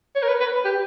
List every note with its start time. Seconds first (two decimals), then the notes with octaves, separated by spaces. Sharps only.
0.15 C#5
0.23 A#4
0.28 B4
0.40 B4
0.65 G4